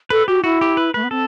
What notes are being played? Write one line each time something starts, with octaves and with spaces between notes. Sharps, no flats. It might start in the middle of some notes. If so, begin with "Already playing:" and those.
A4 B4
F#4 G4
E4 F#4
G4
B4
A3 B4
B3
C4 A4